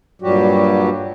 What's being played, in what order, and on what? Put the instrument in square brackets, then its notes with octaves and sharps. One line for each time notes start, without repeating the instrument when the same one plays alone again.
[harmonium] G2 A#2 F#3 G3 F#4 G4